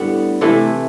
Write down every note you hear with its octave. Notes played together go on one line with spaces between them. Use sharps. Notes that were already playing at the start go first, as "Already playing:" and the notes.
Already playing: A2 D3 G3 B3 D4 F#5
C3 E3 A3 E4